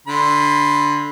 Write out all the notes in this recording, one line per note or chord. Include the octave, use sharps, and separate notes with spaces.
D3 B5 C6